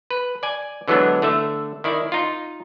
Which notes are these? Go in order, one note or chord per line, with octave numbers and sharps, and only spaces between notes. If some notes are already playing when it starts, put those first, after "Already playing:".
B4
D5 G#5
D3 E3 F#3 G#3 B3 D4
D3 A3 E5
D#3 E4 D5
D#4 F4